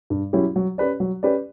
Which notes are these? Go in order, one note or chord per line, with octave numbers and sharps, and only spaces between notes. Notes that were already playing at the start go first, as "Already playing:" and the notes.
G2
F#3 C#4 E4 G4
F#3
C#4 G4 B4 D5
F#3
C#4 G4 B4 D5